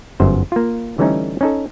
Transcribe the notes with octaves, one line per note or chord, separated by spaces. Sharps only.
G1 F#2 C5
A#3 F4
D3 E3 G3 A3 C#4 D#4
C#4 D#4 A4